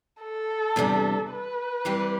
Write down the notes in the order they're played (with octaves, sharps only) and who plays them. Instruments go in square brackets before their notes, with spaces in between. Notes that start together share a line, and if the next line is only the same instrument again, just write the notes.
[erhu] A4
[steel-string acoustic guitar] E2 C3 G3 D4
[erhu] B4
[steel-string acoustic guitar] E3 G3 C4 G4